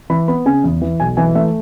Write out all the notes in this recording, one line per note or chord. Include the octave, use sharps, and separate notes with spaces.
E3 B5
B3 B5
C#3 G#5
E2
E3
B1 G#5
E3 G#5
A3 E5